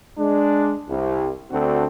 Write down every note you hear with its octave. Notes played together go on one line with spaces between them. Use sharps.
G#3 D4
C2
D2 C4 D4 F#4 A4